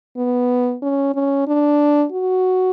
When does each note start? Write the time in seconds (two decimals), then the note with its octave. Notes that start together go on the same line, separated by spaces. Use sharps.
0.17 B3
0.82 C#4
1.14 C#4
1.47 D4
2.12 F#4